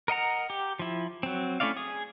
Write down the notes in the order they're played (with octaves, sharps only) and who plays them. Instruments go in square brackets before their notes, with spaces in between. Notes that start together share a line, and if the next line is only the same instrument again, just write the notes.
[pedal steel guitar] A#4 D#5 F#5 A#5
G4
F3 E4
F#3 C4
A3 C#4 E4 D5 F5
G#4 D#6